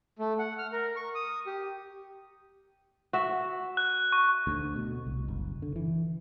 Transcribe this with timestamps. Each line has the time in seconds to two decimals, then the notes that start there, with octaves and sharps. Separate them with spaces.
0.19 A3
0.39 F#5
0.58 F6
0.72 A#4
0.96 C#6
1.15 D#6
1.46 G4
3.13 F#4 E5
3.77 F#6
4.12 C#6
4.47 D2
4.76 B2
5.07 C2
5.28 F#1
5.62 D3
5.76 E3